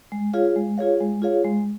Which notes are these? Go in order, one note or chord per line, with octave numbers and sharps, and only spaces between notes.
G#3
F4 G#4 C#5 F5
G#3
F4 G#4 C#5 F5
G#3
F4 G#4 C#5 F5
G#3